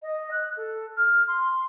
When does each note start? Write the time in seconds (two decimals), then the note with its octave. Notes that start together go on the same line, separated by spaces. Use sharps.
0.02 D#5
0.31 F#6
0.57 A4
0.97 F6
1.28 C6